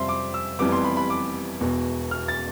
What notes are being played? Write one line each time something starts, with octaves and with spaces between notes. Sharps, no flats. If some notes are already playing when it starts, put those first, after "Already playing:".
Already playing: F2 C3 G3 C4 E5 C6
D6
E6
F1 F2 E3 G3 B3 D6
C6
B5
B5
D6
E1 E2 B2
F6
A6